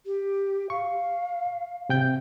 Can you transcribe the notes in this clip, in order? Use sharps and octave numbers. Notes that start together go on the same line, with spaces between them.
G4
F5 C#6
C3 G5 G6